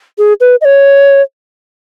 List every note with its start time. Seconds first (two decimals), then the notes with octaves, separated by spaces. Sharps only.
0.18 G#4
0.40 B4
0.61 D#5
0.65 C#5